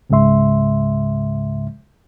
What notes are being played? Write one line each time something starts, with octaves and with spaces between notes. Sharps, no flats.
C#2 G#2 C#3 G#3 E5 C6